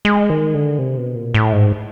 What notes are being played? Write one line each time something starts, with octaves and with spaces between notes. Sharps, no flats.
G#3
D#3
D3
C3
B2
A#2
A2
G#2